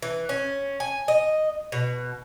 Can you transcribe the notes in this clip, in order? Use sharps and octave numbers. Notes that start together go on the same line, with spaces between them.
E3
C#4
G#5
D#5
B2